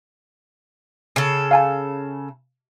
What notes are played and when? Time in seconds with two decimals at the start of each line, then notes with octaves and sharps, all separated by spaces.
1.16 C#3 A4
1.51 F5 G#5 A5